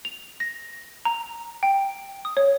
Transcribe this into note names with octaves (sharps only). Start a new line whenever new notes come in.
F7
A#6
A#5
G5
D#6
C#5